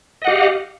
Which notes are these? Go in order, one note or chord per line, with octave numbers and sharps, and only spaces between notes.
G4 D#5 F5 F#5